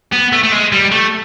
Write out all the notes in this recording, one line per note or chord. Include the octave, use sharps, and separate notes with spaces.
B3
A3
A3
G#3
G3
A3